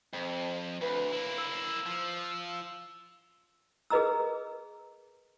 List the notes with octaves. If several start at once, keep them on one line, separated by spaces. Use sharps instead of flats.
F2
D2 B4
A#3 E4
E6
F3
G#4 A#4 B4 D#5 A#5 E6